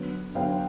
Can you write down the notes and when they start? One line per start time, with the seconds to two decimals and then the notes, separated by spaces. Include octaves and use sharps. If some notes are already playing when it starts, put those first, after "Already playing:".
Already playing: D3 F#3 B3
0.35 D3 F#3 B3 F5 G5